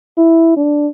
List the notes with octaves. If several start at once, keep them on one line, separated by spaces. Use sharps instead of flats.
E4
D4